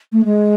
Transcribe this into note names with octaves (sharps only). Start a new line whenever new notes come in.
A3
G#3